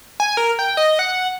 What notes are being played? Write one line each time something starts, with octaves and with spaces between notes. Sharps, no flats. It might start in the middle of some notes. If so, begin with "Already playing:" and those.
G#5
A#4
G5
D#5
F#5